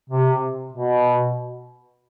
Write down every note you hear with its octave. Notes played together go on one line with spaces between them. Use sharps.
C3
B2